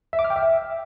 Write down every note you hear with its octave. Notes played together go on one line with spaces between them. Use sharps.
E5
D6
F6
G5
E5